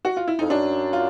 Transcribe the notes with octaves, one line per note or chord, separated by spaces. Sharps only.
F#4
F4
E4
F2 D#4
F#2 D4
F4